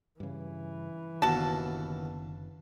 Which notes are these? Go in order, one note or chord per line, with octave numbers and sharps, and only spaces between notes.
G2 C#3 E3
F#1 D#2 B2 D3 F#4 A5